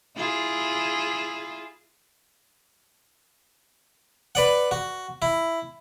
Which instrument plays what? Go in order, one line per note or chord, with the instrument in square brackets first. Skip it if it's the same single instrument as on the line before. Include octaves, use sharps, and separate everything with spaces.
[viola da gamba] E4 F4 G#4
[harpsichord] B4 D5 F#5
F#4
E4